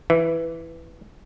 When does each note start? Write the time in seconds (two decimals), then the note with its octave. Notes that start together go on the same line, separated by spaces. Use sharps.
0.10 E3